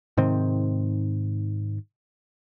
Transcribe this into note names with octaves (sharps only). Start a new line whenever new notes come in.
G#2 C3 D#3 C4